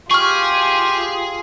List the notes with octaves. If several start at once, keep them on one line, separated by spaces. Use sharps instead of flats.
F4 G4 G#4 C#6 F6